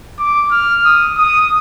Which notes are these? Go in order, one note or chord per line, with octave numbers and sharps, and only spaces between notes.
D6
F6
D#6
D#6